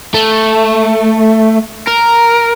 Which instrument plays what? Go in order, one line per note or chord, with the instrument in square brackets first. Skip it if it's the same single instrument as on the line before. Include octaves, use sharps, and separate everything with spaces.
[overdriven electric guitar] A3
A#4